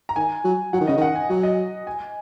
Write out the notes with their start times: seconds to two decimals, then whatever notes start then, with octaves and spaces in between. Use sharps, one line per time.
0.09 A#5
0.16 D#3 G#5
0.44 F#3
0.73 F#3 F#5
0.81 D#3
0.87 C#3 D#5
0.97 D#3 F#5
1.15 G#5
1.30 F#3 F#5
1.43 D#5
1.87 G#5